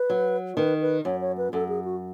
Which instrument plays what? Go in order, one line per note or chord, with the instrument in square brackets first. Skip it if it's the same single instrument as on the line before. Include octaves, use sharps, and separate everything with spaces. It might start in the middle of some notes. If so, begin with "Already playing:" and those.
Already playing: [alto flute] B4
[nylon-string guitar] F#3
[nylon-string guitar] D#3 [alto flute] B4
[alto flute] B4
[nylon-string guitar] F#2 [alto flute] C#5
[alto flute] C#5
B4
[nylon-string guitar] F#2 [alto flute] A4
[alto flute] G#4
F#4